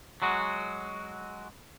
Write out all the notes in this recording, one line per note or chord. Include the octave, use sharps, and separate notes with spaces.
F#3 G#3 F#4